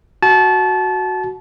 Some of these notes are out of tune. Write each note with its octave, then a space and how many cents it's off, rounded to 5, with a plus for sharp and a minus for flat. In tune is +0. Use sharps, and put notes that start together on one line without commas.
F#4 +0 A5 -25